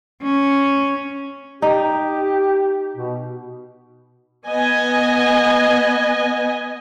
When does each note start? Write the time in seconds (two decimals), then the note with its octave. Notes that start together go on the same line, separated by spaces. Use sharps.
0.23 C#4
1.62 D#4 G4
2.97 B2
4.47 B3 D#5 G#5